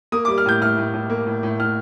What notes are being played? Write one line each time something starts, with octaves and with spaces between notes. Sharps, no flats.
A#3 D#6
D6
G3
F6
A2 G6
A2 F6
A2
A2
A#3
A2
A2
A2 F6